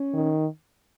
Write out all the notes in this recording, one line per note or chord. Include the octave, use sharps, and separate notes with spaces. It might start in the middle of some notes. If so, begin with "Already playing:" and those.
Already playing: C#4
D#3